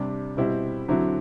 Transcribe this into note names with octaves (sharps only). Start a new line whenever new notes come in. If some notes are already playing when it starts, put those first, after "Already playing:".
Already playing: C3 G3 D4
B2 G3 C4 E4 G4
D3 F#3 C4 E4